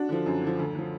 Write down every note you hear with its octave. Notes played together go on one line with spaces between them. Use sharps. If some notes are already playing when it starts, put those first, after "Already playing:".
Already playing: D4 F#4
D3 F3
F#2
D3
F3
D2
D3 F3